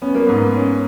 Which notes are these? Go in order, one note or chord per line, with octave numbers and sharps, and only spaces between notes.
B3 C#4
A#3
G#2 B3
C#4